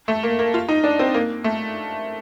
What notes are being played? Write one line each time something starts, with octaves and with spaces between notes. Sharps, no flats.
A3
A#3
A#3
F4
D#4
D4
C4
A#3
A3